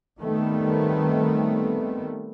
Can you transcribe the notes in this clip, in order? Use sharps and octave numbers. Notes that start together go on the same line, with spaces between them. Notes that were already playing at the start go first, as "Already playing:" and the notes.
D#3 G3 A3 B3 C4